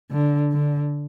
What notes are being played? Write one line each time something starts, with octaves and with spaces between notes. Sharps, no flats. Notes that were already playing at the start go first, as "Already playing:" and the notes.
D3
D3